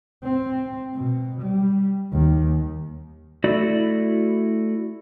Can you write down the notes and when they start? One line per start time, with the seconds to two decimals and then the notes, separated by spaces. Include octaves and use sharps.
0.23 C4
0.94 B2
1.42 G3
2.13 D#2
3.44 A3 E4 F#4 D5